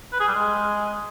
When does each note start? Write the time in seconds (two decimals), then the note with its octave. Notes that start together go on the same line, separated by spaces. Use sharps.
0.12 B4
0.20 G#4
0.28 G3
0.35 G#3